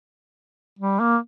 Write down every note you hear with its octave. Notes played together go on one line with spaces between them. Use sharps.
G3
A#3